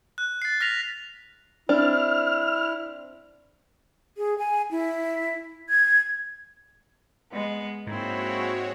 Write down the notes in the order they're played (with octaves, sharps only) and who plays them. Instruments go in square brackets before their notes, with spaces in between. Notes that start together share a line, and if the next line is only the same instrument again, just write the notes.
[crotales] F#6
A6 C7
F6 A#6 B6 F7
[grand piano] C4 [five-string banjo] D4 [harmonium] E4 [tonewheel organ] F6
[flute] G#4
G#5
E4
G#6
[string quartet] G#3 B3
[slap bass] G#2 [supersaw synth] G#3 F#4 C#5 [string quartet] A#3 C4 E4